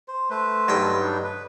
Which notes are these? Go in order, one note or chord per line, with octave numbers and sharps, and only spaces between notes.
C5
A3 B4 C5
B1 G2 G5
D4 D#4
B4